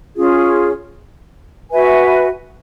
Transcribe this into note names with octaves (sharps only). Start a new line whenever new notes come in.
C#4 F4 G#4
F#4 B4 E5 G#5